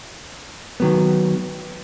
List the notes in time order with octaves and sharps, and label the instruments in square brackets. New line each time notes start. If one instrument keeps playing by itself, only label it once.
[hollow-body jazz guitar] D#3 F#3 B3